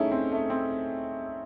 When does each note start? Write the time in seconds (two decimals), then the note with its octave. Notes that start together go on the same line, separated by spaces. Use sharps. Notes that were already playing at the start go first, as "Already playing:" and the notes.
Already playing: A3 C#4 D#4 E4 G#4
0.12 C4
0.32 A3
0.50 C4